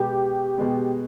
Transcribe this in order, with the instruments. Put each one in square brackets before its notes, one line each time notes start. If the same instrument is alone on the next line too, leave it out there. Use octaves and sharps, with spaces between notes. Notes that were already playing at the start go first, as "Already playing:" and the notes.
Already playing: [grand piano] B2 G#3 B3 [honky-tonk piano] G4
[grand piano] B2 G#3 B3